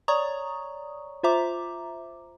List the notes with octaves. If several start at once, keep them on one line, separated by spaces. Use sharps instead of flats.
C#5 D5 A#5 C#6 D#6
F4 C5 E5 A#5 D6